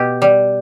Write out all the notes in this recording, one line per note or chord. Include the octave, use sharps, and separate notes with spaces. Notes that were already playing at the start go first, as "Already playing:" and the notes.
Already playing: B2 G4
G3